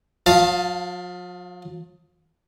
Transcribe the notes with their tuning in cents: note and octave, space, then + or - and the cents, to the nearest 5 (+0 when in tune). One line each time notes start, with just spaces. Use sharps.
F3 +45 F5 +0 A5 +5